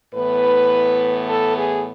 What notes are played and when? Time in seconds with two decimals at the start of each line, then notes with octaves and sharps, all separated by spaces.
0.14 A2 E3 B3 B4
1.29 A4
1.57 G#4